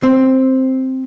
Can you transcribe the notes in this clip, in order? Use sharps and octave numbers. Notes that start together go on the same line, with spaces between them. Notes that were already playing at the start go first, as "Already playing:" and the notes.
C4